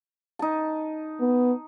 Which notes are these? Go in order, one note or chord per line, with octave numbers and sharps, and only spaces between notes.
D#4 A5
B3